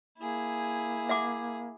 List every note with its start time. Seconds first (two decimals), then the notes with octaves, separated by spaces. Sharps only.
0.18 A#3 E4 G#4
1.09 E5 F#5 D6